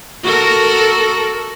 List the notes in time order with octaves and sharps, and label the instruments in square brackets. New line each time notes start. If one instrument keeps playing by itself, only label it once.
[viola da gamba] F#4 A4 A#4